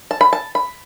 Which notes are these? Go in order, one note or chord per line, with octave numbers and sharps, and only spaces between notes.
A5
B5
A5
B5